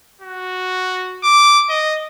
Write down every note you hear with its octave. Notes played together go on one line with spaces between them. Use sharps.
F#4
D6
D#5